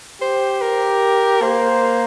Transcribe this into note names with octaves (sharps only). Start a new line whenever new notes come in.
G4 C5
A#4
A#3 C5